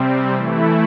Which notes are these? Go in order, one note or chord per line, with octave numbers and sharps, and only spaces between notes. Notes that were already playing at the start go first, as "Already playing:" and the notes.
Already playing: C3 G3 C4
E3 A3 E4